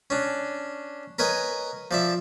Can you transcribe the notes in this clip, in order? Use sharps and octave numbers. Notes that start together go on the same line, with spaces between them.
C#4 D4
A#4 B4 C#5 D#5 G#5
F3 D5 E5